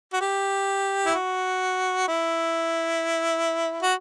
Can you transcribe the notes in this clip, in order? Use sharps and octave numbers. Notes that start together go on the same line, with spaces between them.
F#4
G4
E4
F#4
E4
F#4